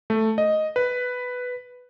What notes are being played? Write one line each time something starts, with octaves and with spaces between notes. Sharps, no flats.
A3
D#5
B4